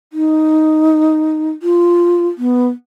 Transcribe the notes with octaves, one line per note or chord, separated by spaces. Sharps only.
D#4
F4
B3